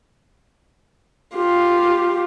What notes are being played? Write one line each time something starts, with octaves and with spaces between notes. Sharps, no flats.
F4 G4